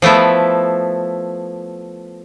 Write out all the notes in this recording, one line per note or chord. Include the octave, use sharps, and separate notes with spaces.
F3 A3 B3 E4